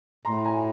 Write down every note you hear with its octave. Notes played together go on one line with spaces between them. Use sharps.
A2 A#5 C6
G#5 A#5